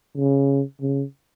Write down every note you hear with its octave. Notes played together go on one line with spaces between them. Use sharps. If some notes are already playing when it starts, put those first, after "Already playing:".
C#3
C#3